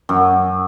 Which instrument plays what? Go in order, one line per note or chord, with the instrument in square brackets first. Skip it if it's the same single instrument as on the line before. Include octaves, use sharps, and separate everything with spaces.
[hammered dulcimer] F#2